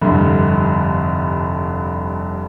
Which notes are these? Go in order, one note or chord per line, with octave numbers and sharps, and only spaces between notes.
F1 C2 G2 D3